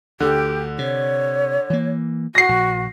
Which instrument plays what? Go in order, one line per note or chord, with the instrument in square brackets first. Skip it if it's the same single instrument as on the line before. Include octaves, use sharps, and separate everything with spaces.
[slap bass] D2 [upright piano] D3 [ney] G4
[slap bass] C3 [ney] C#5
[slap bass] E3 A#3
[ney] F#4 [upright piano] A#6 C7
[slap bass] A#1